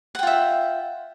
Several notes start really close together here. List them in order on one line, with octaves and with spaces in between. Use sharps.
F#5 G5 F4 E5